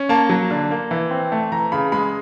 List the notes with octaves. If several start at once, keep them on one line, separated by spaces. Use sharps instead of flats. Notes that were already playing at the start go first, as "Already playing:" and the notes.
Already playing: C#4
A#3 A5
F#3
D3
A#3
E3
C4
A3
E3 A#5
C#3 B5
G#3 B5